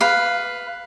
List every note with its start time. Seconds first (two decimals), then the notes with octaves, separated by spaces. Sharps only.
0.01 B4 F5